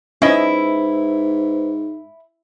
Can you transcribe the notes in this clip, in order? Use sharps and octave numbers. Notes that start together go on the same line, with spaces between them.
G#2 C#4 E4 B4 C5 D#5